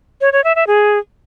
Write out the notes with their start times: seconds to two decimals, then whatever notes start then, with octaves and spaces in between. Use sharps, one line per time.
0.21 C#5
0.33 C#5
0.44 E5
0.56 E5
0.67 G#4